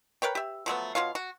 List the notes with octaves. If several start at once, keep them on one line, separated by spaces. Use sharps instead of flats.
A#4 B4 C#5 G5
G4 E5
F3 F#3 A3 B3
B2 F4 C#5 F5
F#4